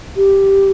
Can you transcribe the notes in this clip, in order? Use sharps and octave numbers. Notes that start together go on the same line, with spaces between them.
G4